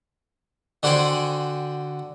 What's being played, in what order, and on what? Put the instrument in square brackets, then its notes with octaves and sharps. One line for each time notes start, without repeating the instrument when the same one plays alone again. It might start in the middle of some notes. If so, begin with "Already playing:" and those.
[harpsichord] D3 F#4 C5 G5 G#5